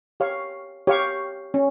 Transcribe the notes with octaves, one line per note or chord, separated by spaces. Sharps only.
G4 C#5 F5 C#6
G4 C#5 F5 C#6
C#4